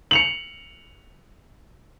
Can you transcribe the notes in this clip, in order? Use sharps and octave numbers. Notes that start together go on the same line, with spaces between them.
C#7 F7 F#7